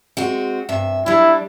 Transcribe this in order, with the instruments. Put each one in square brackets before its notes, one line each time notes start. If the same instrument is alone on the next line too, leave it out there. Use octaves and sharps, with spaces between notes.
[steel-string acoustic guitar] G#3 C4 F#4
G2 C3 E5
[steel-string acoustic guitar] G3 D4 [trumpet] E4